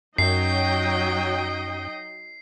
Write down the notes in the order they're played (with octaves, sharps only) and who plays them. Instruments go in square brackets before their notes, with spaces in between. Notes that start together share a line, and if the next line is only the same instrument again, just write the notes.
[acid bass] F#2 [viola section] F#3 G5 [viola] D#4 D#5 [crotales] C7